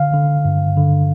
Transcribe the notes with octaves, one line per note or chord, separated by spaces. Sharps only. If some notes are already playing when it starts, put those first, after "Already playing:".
Already playing: D3 F5
D3
G2
D3